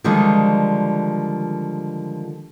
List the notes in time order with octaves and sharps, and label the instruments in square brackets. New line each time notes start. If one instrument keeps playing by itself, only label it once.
[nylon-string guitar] D3 D#3 F3 G3 G#3